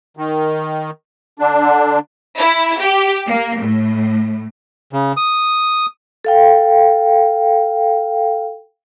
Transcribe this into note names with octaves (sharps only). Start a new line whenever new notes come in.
D#3
D3 D4
E4
G4
A#3
A2
C#3
D#6
A4 F5 G5